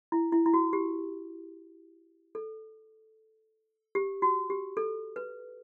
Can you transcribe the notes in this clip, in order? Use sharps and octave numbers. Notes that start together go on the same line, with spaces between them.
E4
E4
E4
F#4
G4
A4
G4
F#4
G4
A4
B4